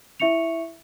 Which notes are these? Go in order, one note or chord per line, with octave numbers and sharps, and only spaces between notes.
E4 E5 C#6 C#7 F7